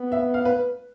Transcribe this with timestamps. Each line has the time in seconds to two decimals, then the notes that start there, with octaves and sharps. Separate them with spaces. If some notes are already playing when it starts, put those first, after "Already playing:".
Already playing: B3
0.12 E5
0.34 F5
0.45 B4